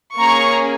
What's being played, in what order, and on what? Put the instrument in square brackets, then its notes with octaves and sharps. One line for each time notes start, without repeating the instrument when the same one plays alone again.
[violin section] A#3 C#4 G#4 A#5 C#6